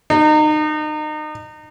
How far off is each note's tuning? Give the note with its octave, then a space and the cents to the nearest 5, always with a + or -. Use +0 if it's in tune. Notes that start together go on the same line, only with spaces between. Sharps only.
D#4 -30